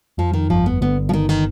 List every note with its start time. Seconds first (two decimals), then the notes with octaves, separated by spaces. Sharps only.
0.18 F2 F3
0.33 D#3
0.50 G1 F3
0.66 B3
0.81 D3 B3
1.09 F3
1.13 G1 D#3
1.29 D#3